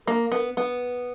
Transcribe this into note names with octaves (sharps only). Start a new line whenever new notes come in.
A#3 A#4
B3
B3